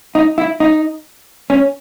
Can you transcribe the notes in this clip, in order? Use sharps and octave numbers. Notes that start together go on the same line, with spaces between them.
D#4
E4
D#4
C#4